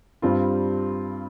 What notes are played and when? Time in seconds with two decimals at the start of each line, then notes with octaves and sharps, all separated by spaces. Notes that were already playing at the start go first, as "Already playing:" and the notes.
0.22 G2 G3 C4 F4